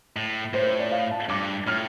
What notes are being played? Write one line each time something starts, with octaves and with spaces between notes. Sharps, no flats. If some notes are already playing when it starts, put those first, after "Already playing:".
A2
A2 C5
C5
D5
F5
A5
G2 D6
A2 F6